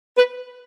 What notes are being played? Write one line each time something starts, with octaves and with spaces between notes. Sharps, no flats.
B4